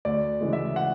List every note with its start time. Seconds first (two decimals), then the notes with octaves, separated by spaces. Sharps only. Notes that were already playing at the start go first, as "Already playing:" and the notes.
0.05 D2 D5
0.41 C#3 E3 G#3
0.53 E5
0.76 F#5